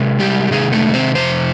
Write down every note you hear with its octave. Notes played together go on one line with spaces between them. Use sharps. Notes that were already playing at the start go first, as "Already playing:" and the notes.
Already playing: C3 G#3
G3 G4
C3 D#3 G#3 G#4
A3 A4
C4 C5
F2 C3 C5